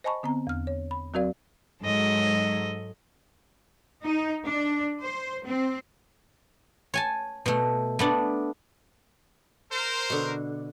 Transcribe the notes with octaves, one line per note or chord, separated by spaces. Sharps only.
C5 D#5 G#5 A5 B5 C#6
D3 B3 C4 A#5
E2 F6
C#5
B5
F#3 C4 F#4 A#4 D5 F5
G#2 F#3 A4 D#5
D#4
D4
C5
C4
C#5 G#5 A5
B2 A3
A3 B3 D4
A#4 C5
B2 D3